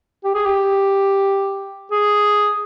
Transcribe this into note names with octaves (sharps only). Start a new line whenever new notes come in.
G4
G#4
G4
G#4